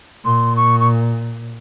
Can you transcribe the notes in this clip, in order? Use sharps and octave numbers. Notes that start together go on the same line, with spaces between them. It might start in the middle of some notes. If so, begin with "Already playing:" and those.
A#2 C6
C#6
C#6